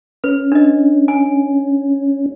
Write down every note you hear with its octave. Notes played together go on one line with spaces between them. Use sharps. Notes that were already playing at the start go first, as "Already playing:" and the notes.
C#4 B4
D4 D#5
G#5